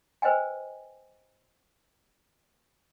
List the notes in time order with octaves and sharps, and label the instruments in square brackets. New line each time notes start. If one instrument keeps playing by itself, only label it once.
[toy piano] B4 C5 D#5 G5 G#5